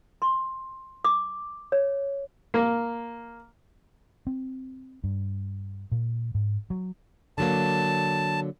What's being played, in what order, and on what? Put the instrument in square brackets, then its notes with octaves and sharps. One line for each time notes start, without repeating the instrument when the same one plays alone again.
[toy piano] C6
D6
C#5
[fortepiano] A#3
[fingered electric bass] C4
G2
A#2
G#2
F#3
[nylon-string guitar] D3 F#3 A#3 [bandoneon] A5